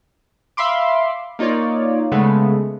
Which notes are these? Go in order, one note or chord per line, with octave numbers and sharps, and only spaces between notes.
E5 F5 B5 C6 D6
A#3 D#4 F4 C#5 D5
C#3 G#3 A3 B3